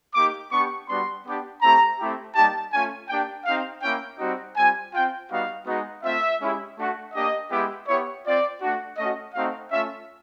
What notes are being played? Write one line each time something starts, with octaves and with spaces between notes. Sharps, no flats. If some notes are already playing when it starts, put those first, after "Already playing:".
A#3 D#4 G4 D6
B3 D4 G4 C#6
G3 B3 D4 F#4 C6
B3 D4 G4
A3 C4 E4 G4 A#5
A3 C4 E4 G4
G3 A#3 D#4 G4 A5
A3 C#4 F4 G#5
A#3 D4 G4 G5
C4 D#4 G4 F5
A#3 C#4 E4 G5
G3 C4 D#4 F#4
G3 C4 F4 G#5
C4 F4 G5
G3 B3 D#4 F#4 F5
G#3 B3 D#4 F#4
A3 C4 F4 E5
G#3 C#4 E4 G4
A3 D4 F#4
A#3 D4 G4 D#5
G#3 B3 E4 G4
B3 E4 G4 C#5
C4 F4 D5
A3 D4 F#4
A3 C#4 F#4 D#5
A3 C4 D#4 F#4 F5
A3 C#4 F4 E5